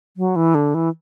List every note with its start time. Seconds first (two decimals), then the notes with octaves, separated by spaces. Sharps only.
0.17 F#3
0.36 E3
0.55 D3
0.74 E3